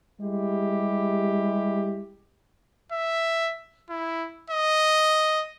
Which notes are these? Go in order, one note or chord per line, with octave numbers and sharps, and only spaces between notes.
G3 G#3 E4 G4
E5
E4
D#5